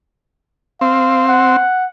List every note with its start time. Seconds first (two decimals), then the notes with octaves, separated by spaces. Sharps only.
0.81 C4 F5
1.28 F#5